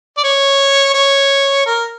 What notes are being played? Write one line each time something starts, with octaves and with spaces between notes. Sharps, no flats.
D5
C#5
C#5
A#4